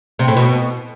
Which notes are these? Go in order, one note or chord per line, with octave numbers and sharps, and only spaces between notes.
C3
A2
B2